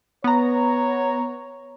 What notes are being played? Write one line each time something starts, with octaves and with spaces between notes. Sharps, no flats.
B3 C#5 A#5